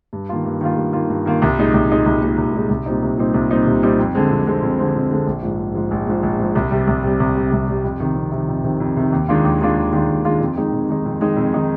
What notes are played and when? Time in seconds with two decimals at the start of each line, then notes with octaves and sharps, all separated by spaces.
0.13 G2
0.29 D#3 A#3 F4
0.45 G2
0.61 D#3 A#3 F4
0.77 G2
0.93 D#3 A#3 F4
1.10 G2
1.26 D#3 A#3 F4
1.42 C2
1.58 A#2 G#3 D#4
1.74 C2
1.89 A#2 G#3 D#4
2.06 C2
2.22 A#2 G#3 D#4
2.37 C2
2.54 A#2 G#3 D#4
2.69 C2
2.86 A#2 G3 C4 D#4
3.02 C2
3.17 A#2 G3 C4 D#4
3.34 C2
3.50 A#2 G3 C4 D#4
3.66 C2
3.82 A#2 G3 C4 D#4
3.99 F2
4.15 D3 G#3 C4
4.31 F2
4.46 D3 G#3 C4
4.62 F2
4.79 D3 G#3 C4
4.95 F2
5.10 D3 G#3 C4
5.27 A#1
5.43 G#2 F3
5.59 A#1
5.75 G#2 F3
5.91 A#1
6.07 G#2 F3
6.23 A#1
6.39 G#2 F3
6.55 C2
6.71 C3 G3
6.87 C2
7.04 C3 G3
7.20 C2
7.35 C3 G3
7.52 C2
7.68 C3 G3
7.84 F2
8.00 C3 D#3
8.16 F2
8.31 C3 D#3
8.48 F2
8.64 C3 D#3
8.80 F2
8.96 C3 D#3
9.12 D#2
9.28 D#3 G#3 D4 F4
9.45 D#2
9.61 D#3 G#3 D4 F4
9.77 D#2
9.93 D#3 G#3 D4 F4
10.09 D#2
10.25 D#3 G#3 D4 F4
10.40 F2
10.56 D#3 G#3 D#4
10.73 F2
10.89 D#3 G#3 D#4
11.05 F2
11.21 D#3 G#3 D#4
11.37 F2
11.53 D#3 G#3 D#4